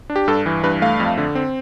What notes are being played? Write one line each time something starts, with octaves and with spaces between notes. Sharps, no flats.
D4
G4
G2 A4
E3
G2 B4
A3 F5
F2
D3
C4